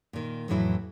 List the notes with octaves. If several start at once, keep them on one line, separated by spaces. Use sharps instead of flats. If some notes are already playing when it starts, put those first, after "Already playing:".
A#2 D#3
F2 A2 E3 F#3 E4